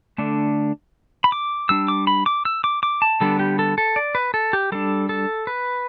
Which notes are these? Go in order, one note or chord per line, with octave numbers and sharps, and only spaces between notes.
D3 A3 D4
B5
D6
G3 D4 E6
D6
B5
D6
E6
D6
D6
A5
D3 G3 B3 D4 A4
G4
A4
A4
D5
B4
A4
G4
G3 D4 A4
A4
B4